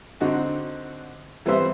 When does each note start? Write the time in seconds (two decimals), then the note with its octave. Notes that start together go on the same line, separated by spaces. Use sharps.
0.21 D3 C4 D#4 F#4
1.46 E3 G3 B3 C4 C5 E5